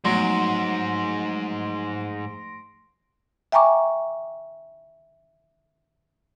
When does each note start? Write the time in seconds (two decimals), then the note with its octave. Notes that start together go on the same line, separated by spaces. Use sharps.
0.05 G#2 F3 F#3 A3 C6 A#6 D7
3.52 E5 G5 G#5 A#5 C#6 D6